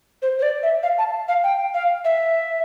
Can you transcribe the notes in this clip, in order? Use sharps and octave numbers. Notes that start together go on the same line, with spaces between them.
C5
C5
D5
E5
F5
A5
F5
G5
F5
E5